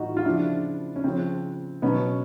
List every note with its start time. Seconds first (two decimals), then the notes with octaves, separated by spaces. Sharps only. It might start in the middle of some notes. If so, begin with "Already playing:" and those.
Already playing: A2 E3 G3 D#4 F4 F#4
0.17 F4
0.25 C#3 F3 D4 E4
0.96 C#4
1.04 C#3 F3 C4
1.82 B2 F#3 B3 C#4